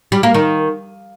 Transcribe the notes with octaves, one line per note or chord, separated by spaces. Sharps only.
G3
A#3
D#3